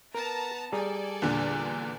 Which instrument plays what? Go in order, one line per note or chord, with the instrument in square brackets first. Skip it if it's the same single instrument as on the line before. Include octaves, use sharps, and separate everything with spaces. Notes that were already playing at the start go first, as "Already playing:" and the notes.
[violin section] B3 A5 A#5 [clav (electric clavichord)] A#4
[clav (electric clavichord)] G3 G#4 A#5 [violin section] A4 D5 G#5
[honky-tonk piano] E2 A#2 D3